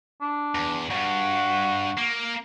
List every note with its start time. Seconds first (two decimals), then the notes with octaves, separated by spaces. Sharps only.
0.21 D4
0.55 E2
0.90 D2 G2 F#4
1.97 A#3